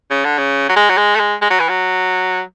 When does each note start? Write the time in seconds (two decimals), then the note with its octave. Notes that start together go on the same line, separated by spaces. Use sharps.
0.11 C#3
0.25 D3
0.38 C#3
0.69 F#3
0.76 G#3
0.90 F#3
0.97 G#3
1.16 A3
1.20 G#3
1.42 G#3
1.50 F#3
1.60 E3
1.69 F#3